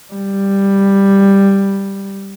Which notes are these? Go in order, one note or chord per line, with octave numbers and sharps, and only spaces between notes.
G3